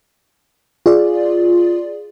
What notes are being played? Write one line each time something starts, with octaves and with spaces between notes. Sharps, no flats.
F4 G#4 D5